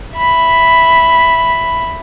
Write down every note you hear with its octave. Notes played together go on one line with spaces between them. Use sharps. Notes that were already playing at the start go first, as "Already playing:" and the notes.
E5 B5